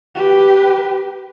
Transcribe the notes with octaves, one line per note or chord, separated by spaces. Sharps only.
G4 B4